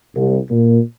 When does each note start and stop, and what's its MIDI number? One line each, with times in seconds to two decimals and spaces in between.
0.16 0.37 36
0.51 0.79 46